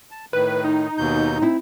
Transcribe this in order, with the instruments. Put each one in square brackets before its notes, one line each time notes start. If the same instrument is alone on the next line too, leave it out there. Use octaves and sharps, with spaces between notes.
[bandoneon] A5
[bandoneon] A2 D#3 [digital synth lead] B4
[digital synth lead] D#4
[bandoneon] D#2 B2 G6
[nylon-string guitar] C4 E4